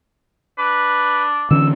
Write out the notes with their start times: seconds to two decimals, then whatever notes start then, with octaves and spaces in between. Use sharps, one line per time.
0.58 D4 B4
1.51 D3 E3 C#4 E6